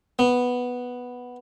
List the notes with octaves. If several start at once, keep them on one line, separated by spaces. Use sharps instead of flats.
B3